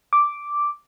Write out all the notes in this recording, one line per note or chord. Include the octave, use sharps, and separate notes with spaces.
D6